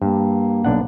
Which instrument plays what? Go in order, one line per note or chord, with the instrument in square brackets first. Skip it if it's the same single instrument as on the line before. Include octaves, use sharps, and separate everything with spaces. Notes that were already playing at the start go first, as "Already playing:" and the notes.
[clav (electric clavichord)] G2 [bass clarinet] A#3
[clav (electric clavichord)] B1 D4 F#5